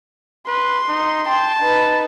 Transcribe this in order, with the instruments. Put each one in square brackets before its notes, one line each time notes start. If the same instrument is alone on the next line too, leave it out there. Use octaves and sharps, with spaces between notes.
[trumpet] B4 [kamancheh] C6
[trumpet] D#4
[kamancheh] G5 C6 [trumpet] A5
[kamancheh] D#4 B4